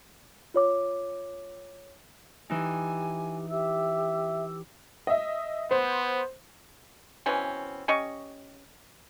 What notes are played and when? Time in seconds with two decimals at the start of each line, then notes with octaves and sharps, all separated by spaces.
0.54 F4 C#5 D6
2.50 E3 D#4 G4 G#5
3.50 G4 E5 E6
5.07 D#5 E5
5.71 B3 C5
7.26 B2 E3 C4 C#4
7.88 C#4 G4 D#5 C#6